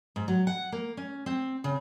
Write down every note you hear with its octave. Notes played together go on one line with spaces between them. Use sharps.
G#2
F#3
F#5
A#3
C#4
C4
C#3